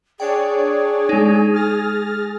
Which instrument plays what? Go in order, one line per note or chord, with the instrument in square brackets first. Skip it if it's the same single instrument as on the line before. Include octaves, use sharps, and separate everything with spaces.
[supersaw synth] D4 C#5 D5 [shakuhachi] G#4 [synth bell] G5
[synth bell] G#3 D#4
[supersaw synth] F6 A6 A#6